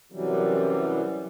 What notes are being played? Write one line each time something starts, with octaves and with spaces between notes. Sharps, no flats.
F#2 C3 E3 F#3 G3